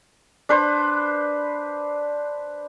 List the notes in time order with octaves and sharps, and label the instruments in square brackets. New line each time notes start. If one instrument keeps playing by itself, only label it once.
[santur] D4 B4 C5